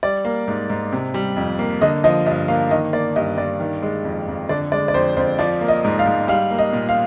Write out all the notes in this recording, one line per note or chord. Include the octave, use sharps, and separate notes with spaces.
G3 D5
A#3
G#2
G#2
C3
G3
F2
A#3
D3 D#5
F3 D#5
G2 D#5
A#3 F5
D#3 D#5
A#3 D5
G2 D#5
G2 D5
D#3
G#3
F2
F2
D3 D5
G#3 D5
D5
F2 C5
F2 C5
F3 D5
A#3
D#5
G#2
F5
G#2
G3 F5
A#3
D#5
A#2
F5